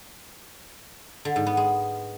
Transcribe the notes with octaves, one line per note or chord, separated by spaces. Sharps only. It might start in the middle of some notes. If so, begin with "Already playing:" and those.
D3
G#2
B3
G#3